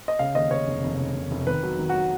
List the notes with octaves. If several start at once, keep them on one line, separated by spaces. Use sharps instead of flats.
D#5
C#3 F5
D#2 D#5
C#3 C#5
F1
F1
C#3
F1
F1
D#3 B4
F#3
D#3
F#3 F#4